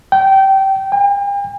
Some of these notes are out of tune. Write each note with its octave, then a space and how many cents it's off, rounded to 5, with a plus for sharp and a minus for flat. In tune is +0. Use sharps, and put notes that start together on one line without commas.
G5 -20
G5 +45